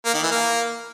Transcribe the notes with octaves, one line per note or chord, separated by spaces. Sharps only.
A#3
D#3
E3
A#3